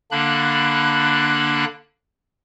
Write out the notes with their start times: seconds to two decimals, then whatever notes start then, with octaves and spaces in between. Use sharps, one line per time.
0.11 D3 A#3 D4 B5 F#6